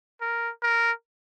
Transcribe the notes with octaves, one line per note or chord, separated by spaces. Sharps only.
A#4
A#4